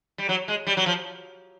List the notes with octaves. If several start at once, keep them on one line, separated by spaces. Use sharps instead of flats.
G3
F#3
G#3
G3
F#3
F3